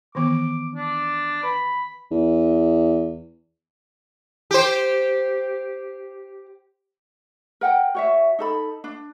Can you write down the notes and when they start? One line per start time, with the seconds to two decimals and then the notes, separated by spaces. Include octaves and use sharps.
0.15 D#3 E3 B3 D6
0.75 D4
1.43 B4 B5
2.11 E2
4.51 G4 C5
7.61 A#4 F#5 G5
7.95 F#4 C#5 E5
8.39 D#4 A4 B5
8.84 D4